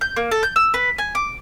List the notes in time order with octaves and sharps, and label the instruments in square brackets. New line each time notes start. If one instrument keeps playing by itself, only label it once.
[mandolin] G6
A#3
A4
G6
E6
B4
G#5
D6